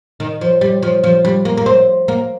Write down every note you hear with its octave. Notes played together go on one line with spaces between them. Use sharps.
D#3
F3
G3
F3
F3
G3
A#3
A#3
C4
A#3